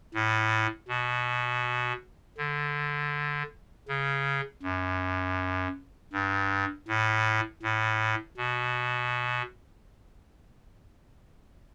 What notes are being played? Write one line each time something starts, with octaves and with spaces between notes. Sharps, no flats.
A2
B2
D3
C#3
F#2
G2
A2
A2
B2